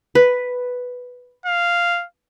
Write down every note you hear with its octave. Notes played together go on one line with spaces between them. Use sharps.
B4
F5